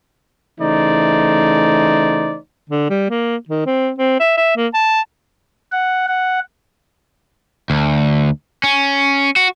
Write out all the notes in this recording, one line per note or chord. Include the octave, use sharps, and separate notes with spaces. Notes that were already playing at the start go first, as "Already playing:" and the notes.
C#3 E3 A3 D#4 C5 D5
D3
G3
A#3
D#3
C4
C4
E5
E5
A#3
A5
F#5
F#5
D2
C#4
F#4